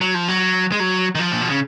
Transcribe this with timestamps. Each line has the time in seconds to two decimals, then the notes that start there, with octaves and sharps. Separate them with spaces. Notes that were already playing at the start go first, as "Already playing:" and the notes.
0.01 F#3
0.14 F3
0.28 F#3
0.72 G#3
0.80 F#3
1.15 D#3
1.19 F3
1.32 A#2
1.41 B2
1.50 C#3